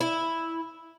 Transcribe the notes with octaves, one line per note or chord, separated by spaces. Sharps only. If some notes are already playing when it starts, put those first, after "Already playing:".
E4